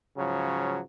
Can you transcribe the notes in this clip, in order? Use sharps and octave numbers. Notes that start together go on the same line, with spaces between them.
G#2 C#3 F3 F#3